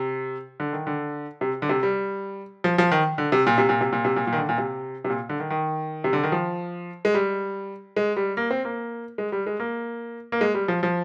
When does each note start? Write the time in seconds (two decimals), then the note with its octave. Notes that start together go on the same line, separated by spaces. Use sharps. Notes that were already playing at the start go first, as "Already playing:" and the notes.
Already playing: C3
0.60 D3
0.73 D#3
0.87 D3
1.41 C3
1.62 D3
1.69 C3
1.83 G3
2.64 F3
2.78 F3
2.92 D#3
3.18 D3
3.32 C3
3.46 A#2
3.58 C3
3.69 A#2
3.81 C3
3.92 A#2
4.05 C3
4.16 A#2
4.27 A#2
4.33 D#3
4.38 D3
4.49 A#2
4.58 C3
5.05 C3
5.09 A#2
5.29 D3
5.40 D#3
5.50 D#3
6.04 C3
6.13 D3
6.23 D#3
6.32 F3
7.05 G#3
7.14 G3
7.96 G#3
8.17 G3
8.37 A#3
8.51 C4
8.65 A#3
9.18 G#3
9.32 G3
9.46 G#3
9.60 A#3
10.32 A#3
10.41 G#3
10.54 G3
10.68 F3
10.83 F3